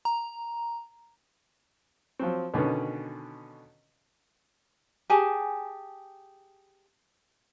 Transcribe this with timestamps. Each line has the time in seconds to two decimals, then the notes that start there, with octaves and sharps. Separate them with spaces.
0.05 A#5
2.19 F3 F#3 C4
2.54 B2 D3 D#3 B3 C#4
5.10 G4 G#4 G#5 A5